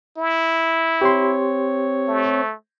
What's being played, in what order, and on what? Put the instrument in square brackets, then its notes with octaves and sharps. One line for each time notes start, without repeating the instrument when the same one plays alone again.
[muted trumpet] E4
[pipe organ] C4 C#5 [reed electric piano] G4 C6
[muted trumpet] A3